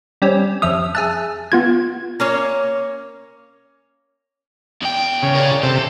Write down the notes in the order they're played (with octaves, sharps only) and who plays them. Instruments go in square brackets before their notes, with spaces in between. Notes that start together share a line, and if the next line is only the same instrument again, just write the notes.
[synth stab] G3 C4 C#4
[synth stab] F2 E5 F6 [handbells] D#6
[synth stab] G#4 E5 A5 [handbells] F#6
[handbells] B3 F4 G#6
[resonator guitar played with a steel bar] A#3 C#4 C#5
[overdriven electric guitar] E2 G5
[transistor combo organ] C#3
[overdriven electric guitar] A#4 D5
[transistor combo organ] C3 [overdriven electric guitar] A4